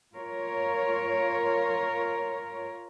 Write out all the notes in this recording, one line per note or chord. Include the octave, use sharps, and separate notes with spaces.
F4 A#4 C#5